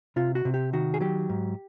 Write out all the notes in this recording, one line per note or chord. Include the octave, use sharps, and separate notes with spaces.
C3 F4
F#4
C3
G4
D#3 F#4
G#4
F#3 G4
G#2